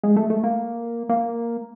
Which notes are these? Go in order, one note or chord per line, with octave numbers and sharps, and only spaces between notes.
G#3
A3
A3
A#3
A#3